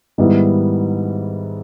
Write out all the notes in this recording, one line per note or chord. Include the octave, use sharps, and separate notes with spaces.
G#2 D#3 G3 B3 E4